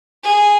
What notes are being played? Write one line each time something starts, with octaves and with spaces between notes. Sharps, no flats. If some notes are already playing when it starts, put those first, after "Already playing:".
G#4